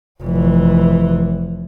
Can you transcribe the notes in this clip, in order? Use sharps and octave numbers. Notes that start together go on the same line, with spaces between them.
F1 E3